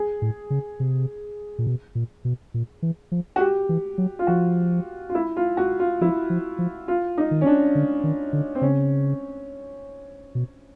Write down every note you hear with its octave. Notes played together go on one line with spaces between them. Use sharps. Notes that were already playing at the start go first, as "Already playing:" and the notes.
Already playing: G#4
A2
C#3
C3
A#2
B2
A#2
B2
A#2
E3
F3
F#4
G4
E3
F#3
F4
F3 F#4
F4
E4
F4
F#4
F4
F3 E4
F3
F3
F4
D#4
D#3
C#4
D4
D3
D#3
D3
C4
C#3 C#4
B2